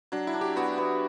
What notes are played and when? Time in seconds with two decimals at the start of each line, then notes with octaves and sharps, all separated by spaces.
0.12 F#3 D4
0.27 E4
0.34 D4
0.41 G4
0.56 B3 F#4
0.78 B3